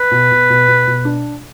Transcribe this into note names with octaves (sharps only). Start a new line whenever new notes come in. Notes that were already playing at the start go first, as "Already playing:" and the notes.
Already playing: B4
B2
B2
B2
B2
B2
D4